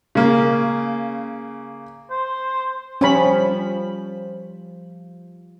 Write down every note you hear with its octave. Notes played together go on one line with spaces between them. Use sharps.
C#3 A#3
C5
F3 G3 C#4 B5